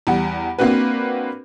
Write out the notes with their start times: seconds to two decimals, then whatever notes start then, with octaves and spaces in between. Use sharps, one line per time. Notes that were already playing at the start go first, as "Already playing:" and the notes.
0.07 E2 G3 F#5
0.59 A#3 C4 D4 F#4 B4